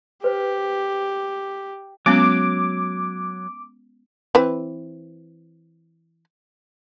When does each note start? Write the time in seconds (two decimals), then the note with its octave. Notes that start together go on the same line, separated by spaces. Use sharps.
0.24 G4 B4 C5
2.06 F#3 G#3 B3 C#4 D6
4.35 E3 C4 B4